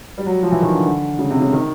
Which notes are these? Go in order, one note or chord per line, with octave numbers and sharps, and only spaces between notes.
G3
F#3
F3
E3
D#3
D3
D3
C#3
C3
C#3
D#3